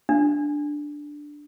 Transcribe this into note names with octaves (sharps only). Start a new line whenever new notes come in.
D4